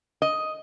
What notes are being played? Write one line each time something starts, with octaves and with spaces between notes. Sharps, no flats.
D#5